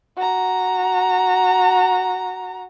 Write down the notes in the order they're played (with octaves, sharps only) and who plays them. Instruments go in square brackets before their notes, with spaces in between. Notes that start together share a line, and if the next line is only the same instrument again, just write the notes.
[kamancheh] F#4 A#5